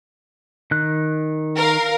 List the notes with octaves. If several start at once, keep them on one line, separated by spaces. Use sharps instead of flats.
D#3 F#6
A#4 F5